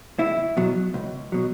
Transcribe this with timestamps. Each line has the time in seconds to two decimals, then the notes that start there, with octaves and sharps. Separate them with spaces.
0.19 C#2 E4
0.57 B2 F#3
0.94 C#2
1.32 B2 F#3